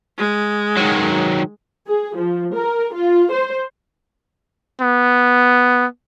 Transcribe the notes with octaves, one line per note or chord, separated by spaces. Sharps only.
G#3
D#3 F#3
G#4
F3
A#4
F4
C5
B3